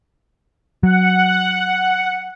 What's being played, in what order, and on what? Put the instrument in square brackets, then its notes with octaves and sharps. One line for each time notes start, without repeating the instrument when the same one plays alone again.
[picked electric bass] F#3 [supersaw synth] F#5